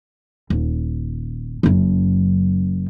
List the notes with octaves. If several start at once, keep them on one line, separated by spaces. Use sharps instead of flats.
D#1
F#1 F#2